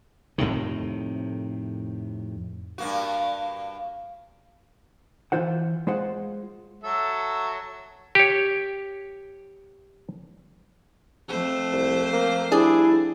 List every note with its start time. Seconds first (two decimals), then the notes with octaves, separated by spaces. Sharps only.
0.38 F2 A2 C3 D#3
2.78 G2 A#3 F#4
5.32 E3 F4 C5 F#5
5.87 G#3 F4 C5 F#5
6.84 F#3 A4 E5
8.15 G4 C#5
11.28 F2 A3 C5
11.72 C2
12.13 A#3
12.52 G3 D4 E4 G#4